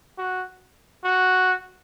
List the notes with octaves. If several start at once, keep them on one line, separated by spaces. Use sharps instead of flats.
F#4
F#4